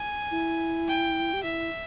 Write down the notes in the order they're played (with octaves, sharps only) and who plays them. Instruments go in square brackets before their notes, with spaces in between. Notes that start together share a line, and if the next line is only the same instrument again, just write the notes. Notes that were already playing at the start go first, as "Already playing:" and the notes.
Already playing: [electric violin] G#5
[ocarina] E4
[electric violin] G5
[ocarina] G4
[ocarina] E4 [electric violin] E5